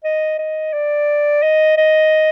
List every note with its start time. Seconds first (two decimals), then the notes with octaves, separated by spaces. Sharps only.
0.04 D#5
0.39 D#5
0.73 D5
1.43 D#5
1.77 D#5